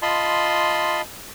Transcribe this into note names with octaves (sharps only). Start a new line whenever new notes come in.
F4 D#5 A5 B5 C6